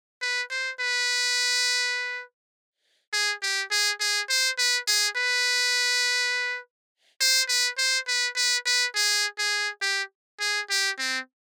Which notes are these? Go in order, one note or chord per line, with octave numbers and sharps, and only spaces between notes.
B4
C5
B4
G#4
G4
G#4
G#4
C5
B4
G#4
B4
C5
B4
C5
B4
B4
B4
G#4
G#4
G4
G#4
G4
C4